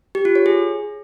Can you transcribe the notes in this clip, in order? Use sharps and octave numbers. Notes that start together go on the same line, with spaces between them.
G4
F4
C#5
G#4